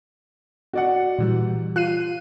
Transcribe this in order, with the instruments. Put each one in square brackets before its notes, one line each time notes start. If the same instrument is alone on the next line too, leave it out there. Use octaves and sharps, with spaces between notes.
[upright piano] F#4 D5 F#5
[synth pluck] A#2 E3 G3
[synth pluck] F4 C7 D#7 [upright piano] F#6